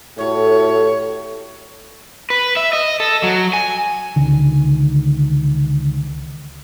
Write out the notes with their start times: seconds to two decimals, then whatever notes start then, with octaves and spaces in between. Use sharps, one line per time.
0.18 A2 F#4 G4 A4 C#5
2.30 B4
2.57 E5
2.73 D#5
3.00 A4
3.23 F#3
3.53 G#5
4.16 C#2 D3 D#3